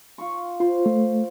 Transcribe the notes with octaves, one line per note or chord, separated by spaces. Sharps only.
F4 C#6
F4 C5
A3